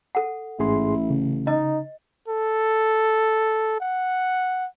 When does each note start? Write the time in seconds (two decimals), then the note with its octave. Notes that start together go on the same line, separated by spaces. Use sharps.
0.15 A4 F#5
0.59 A1 G#2 E4 G#4 C6
1.10 C#3
1.47 D#4 D#5
2.28 A4
3.80 F#5